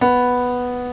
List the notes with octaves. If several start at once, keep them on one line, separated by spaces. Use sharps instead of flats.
B3